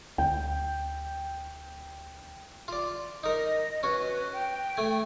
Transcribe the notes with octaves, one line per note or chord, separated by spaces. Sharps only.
D2 G5
F4 D5
D#4 A#4 D#5
C#4 F#4 B4
G5
A3 G#5